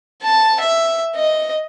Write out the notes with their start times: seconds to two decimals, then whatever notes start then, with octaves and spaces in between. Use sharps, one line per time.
0.22 A5
0.60 E5
1.15 D#5